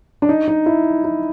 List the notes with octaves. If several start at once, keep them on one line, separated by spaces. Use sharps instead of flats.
D4
D#4
D#4
E4
E4